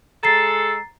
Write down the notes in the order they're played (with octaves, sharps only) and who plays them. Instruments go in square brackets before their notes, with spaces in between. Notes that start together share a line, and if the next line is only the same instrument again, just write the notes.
[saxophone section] G#3 A4 [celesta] A#5 A6 C7